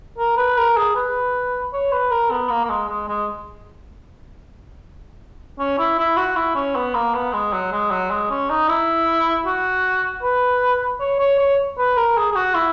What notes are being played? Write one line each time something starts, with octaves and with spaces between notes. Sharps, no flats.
A#4
B4
A#4
G#4
B4
C#5
B4
A#4
B3
A#3
A#3
G#3
G#3
G#3
C#4
E4
E4
F#4
E4
C#4
B3
A#3
B3
G#3
F#3
G#3
F#3
G#3
C#4
D#4
E4
F#4
B4
C#5
C#5
C#5
B4
A#4
G#4
G#4
F#4
E4